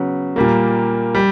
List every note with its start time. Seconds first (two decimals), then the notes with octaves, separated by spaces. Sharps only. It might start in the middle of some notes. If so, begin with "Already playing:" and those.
Already playing: C#3 F#3 B3
0.36 A#2 G3 A#3
1.15 G3